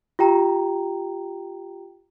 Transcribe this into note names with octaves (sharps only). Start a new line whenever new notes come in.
F4 G4 G5 A#5